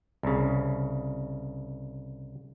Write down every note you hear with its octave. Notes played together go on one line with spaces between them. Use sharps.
C2 C#3